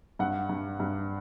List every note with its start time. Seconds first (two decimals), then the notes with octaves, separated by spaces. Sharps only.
0.19 G2 F#5
0.49 G2
0.80 G2